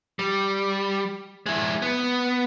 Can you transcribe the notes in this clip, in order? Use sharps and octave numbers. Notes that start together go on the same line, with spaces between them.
G3
G#3 E4
B3